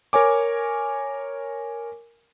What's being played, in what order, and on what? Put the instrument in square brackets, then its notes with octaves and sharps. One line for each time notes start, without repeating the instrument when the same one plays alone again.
[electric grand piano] A#4 C#5 G#5 D6